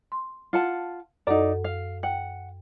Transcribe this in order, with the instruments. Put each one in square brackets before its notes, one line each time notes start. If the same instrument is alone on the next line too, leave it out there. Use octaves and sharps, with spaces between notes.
[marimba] C6
[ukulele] F4 F#5 A5
[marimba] F#2 A4 F#5 [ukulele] D#4 D5
[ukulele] F5
[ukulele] F#5 [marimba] G5